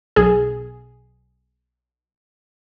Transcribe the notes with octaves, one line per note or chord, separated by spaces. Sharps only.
B1 G#4